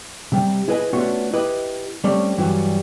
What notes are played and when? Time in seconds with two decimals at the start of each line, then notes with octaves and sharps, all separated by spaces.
0.32 C3 G3
0.68 E4 G#4 B4 D#5 G#5
0.93 A3 B3 C#4 D4 F4 F#4
1.33 E4 G4 B4 D#5
2.04 G3 A3 C4 C#4 D5
2.37 G2 E3 F#3 G3 F#4